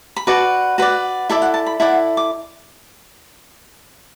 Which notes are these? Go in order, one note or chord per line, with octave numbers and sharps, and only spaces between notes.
B5
F#4 B4 D5 A5
F#4 B4 D5 F#5
E4 A4 D5 E5
F#5
A5
B5
E4 A4 D5 F#5
D6